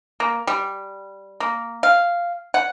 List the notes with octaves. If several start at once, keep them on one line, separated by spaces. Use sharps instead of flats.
A#3
G3
A#3
F5
F#5